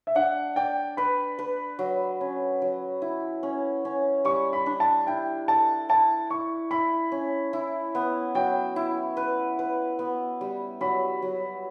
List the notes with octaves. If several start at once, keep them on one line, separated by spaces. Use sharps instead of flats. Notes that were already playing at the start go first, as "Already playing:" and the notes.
E5
D4 F#5
D5 G5
B4 B5
B4
F#3
C#4
F#3
E4
C#4
C#4
G3 C#6
B5
D4
A5
E4 G5
A4 A5
E4 A5
E4 C#6
E4 B5
C#4
E4
B3
F#3 G5
E4
B4
B4
B3
G3
F#3 B5
F#3